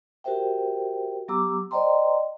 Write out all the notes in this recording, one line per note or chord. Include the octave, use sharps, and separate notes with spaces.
F#4 G4 A#4 C5 E5 G5
F#3 B3 G4 A#5 D6 E6
C5 D5 D#5 G5 A#5 C6